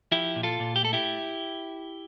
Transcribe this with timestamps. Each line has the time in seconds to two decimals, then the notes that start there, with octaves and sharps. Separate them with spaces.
0.12 F3 E4 G4
0.36 A#2
0.43 F4 A4
0.60 A#2
0.76 G4
0.83 A3 A4
0.93 E4 G4